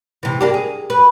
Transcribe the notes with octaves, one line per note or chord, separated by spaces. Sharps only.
C3 E3
A#3 D4 G4
G#4
B4